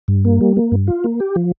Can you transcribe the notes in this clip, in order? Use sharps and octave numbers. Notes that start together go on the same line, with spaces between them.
G2
A#3
G3
A#3
G2
F4
A#3
G4
F3